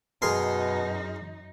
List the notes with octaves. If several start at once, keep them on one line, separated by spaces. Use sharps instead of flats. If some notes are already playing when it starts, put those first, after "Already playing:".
F#2 B2 D#4 G#4 A#4 C6